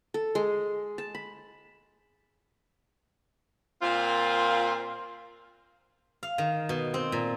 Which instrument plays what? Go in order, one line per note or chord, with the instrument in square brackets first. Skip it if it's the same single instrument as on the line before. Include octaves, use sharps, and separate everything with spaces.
[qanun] A4
G#3
A5
B5
[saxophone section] A#2 A#3 C4 F4
[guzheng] F5
D#3
B2
C4
A#2